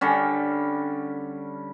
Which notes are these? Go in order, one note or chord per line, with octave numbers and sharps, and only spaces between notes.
D3 G3 C#4